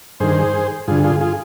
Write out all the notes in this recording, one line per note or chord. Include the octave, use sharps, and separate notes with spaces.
G2 D#3 G#4 C5
G2 D3 F4 G#4
F4 G#4
F4 G#4